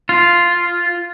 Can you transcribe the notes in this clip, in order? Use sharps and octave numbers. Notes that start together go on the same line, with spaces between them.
F4